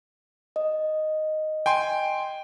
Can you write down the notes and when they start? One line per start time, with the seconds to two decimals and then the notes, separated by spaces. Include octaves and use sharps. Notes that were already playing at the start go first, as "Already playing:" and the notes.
0.56 D#5
1.66 G5 G#5 C6